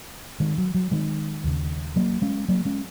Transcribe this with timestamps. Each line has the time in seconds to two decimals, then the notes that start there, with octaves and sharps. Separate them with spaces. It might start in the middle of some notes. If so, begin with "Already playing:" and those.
0.40 D#3 G#3
0.58 F#3
0.74 F#3
0.91 D#3 G#3
1.44 D#2 C#3
1.96 F#3 A#3
2.22 G#3 C#4
2.48 F#3 A#3
2.65 G#3 C#4